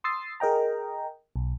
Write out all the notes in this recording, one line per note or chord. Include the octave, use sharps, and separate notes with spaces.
C6 D#6 E6 A6 C7
G#4 A#4 D#5 G5 A#5
B1